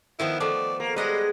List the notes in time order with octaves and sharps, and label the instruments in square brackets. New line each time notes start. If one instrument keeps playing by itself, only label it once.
[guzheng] D#3 F3 B3 [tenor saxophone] E4
[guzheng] F3 A3 [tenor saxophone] D5
[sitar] A#3
[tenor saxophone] G3 [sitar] G#3 [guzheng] B4 D#5 F#5